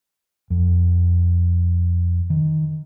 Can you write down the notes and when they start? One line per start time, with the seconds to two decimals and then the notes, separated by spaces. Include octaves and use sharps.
0.50 F2
2.30 D#3